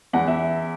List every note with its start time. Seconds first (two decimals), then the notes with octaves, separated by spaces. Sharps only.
0.13 E2 F#5
0.27 E5